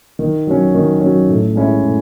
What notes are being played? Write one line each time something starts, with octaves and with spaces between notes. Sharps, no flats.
D#3
F#3 C#4
D#3
F#3 C#4
A2
G#3 C#4 E4
A2